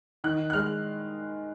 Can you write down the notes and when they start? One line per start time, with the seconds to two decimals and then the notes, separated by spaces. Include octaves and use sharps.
0.24 D#3 F#6
0.50 F#6
0.53 G#3 F6